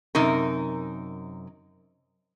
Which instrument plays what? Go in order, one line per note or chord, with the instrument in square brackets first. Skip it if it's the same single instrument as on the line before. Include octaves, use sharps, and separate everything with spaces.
[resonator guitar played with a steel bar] F#2 C3 D#4 A#4